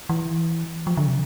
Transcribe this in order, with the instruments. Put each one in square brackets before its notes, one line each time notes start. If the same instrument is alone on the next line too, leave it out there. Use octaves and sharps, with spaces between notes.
[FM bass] E3
F3
D3
C3